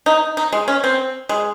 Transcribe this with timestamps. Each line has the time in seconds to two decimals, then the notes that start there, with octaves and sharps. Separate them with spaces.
0.06 D#4
0.37 D#4
0.52 G#3
0.68 C#4
0.84 C4
1.29 G#3